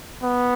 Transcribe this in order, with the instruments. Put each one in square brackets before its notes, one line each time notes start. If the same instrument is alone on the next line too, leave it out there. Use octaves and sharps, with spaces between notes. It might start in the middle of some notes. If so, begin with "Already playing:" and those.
[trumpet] B3